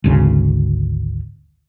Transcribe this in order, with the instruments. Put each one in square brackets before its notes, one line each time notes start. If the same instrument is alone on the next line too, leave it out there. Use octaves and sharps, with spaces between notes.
[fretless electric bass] G#1 D2 C#3